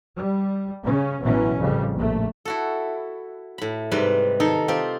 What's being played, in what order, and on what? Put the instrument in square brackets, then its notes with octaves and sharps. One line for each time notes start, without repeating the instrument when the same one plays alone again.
[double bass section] G3
C#3 C#4
A1 B2 E3 F#3 C#4
A1 F2 C#3 G3
A#1 A3
[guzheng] E4 F#4 A4
A2 B5
G#2 C3 G3 B4
D#3 D#4 A4
C4 F4 G4 C5